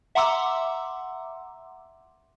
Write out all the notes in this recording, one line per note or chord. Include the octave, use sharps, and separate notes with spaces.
E5 F#5 A#5 C6 D6 E6